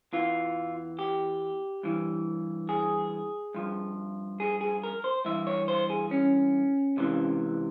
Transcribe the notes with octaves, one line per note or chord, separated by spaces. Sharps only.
E2 E3 F4
G4
G2 E3
G#4
G2 F3
G#4
G#4
A#4
C5
G2 E3 E5
C#5
C5
G#4
C#4
C#2 C3 E3